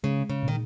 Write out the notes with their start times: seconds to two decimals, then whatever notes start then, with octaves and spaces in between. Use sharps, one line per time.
0.04 C#3 G#3
0.29 C#3
0.43 A#2 D#3